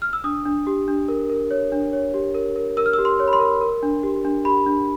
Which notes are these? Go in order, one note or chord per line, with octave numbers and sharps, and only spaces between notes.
F6
E6
D4 D#6
D4
G4
D4
A#4
A#4
C#5
D4
C#5
G4
A#4
A#4
A#4 E6
F6
E6
G4
C6
C#5
B5
C6
A#4
A#4
D4
G4
D4
G4 B5
D4